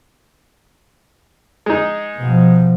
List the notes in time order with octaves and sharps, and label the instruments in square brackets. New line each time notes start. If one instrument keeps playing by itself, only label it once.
[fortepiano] G#3 D#4
[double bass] B2 F3